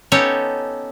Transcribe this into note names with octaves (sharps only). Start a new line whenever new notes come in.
B3 C#4 D#4 G4 A4 C#5